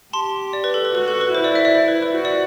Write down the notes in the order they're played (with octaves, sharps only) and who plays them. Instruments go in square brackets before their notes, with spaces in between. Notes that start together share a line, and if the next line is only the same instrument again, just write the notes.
[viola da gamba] G4 [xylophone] A5 C6
[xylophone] D5
B4
A4
B4
[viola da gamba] F#4 [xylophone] B4
[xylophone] A4
B4
[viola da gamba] E4 [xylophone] C5
[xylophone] D5
E5
D5
C5
B4
B4
[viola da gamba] F#4 [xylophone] C5
[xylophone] D5